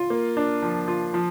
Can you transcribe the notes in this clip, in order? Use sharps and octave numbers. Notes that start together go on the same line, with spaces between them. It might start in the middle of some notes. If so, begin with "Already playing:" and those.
Already playing: F4
A#3
D4
F3
F4
F3